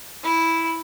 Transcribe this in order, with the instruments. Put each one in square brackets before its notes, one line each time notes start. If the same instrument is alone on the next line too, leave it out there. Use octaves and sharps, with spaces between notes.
[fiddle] E4